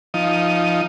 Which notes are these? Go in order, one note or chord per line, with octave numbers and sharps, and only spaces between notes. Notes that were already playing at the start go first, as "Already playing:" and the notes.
F3 D#4